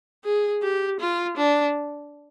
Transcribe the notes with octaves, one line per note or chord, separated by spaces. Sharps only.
G#4
G4
F4
D4